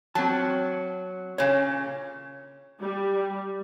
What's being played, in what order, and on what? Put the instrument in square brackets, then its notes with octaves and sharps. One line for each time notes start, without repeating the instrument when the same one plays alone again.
[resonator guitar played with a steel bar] F#3 [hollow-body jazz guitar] C4 A5
[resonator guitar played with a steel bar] A#2 C#3 [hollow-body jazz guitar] C#5
[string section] G3